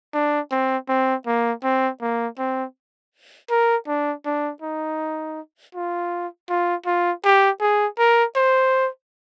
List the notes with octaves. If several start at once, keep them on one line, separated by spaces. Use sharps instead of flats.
D4
C4
C4
A#3
C4
A#3
C4
A#4
D4
D4
D#4
F4
F4
F4
G4
G#4
A#4
C5